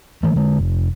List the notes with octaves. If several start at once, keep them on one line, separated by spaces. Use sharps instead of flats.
D#3 E3 A3
D3 G#3
F1